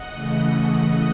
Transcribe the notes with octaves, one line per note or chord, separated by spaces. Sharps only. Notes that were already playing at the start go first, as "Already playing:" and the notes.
Already playing: D#5 F#5
C#3 E3 A3